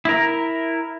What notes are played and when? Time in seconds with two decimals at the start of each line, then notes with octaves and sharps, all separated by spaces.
0.05 E4 A#4